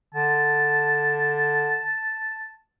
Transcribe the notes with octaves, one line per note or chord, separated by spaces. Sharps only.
D3 A5